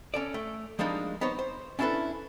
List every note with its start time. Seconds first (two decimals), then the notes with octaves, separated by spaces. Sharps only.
0.14 C#4 A4 D5
0.34 A3
0.79 F3 G3 G#3 A#3 D4 D#4
1.21 B3 D#4 C5 C#5
1.39 C5
1.79 C#4 D4 E4 F#4 A4 B4